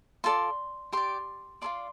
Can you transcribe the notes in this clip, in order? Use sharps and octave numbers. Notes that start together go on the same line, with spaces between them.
F4 A4 D5 C6
G4 D5 C6
F4 A4 D5 C6